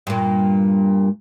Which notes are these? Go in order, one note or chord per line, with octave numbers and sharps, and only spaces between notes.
G2 A#2